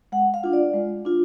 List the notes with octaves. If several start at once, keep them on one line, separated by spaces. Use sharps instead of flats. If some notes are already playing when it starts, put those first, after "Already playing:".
G#3 F#5
F5
D4 F4
D5
G#3
D4 F4